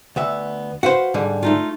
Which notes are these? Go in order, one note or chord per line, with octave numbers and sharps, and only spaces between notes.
D2 B3 E5
F#4 B4 C5 F5 F#5
G#2 D3 G3
A3 D#4 F4